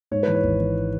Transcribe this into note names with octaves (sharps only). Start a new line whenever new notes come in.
G#2 C#5
E3 B4
C#5
G#1
E3